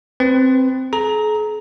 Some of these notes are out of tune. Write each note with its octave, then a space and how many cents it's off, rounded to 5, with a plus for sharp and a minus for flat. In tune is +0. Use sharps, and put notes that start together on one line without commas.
C4 +0 B4 +10
G#4 +45 A#5 +0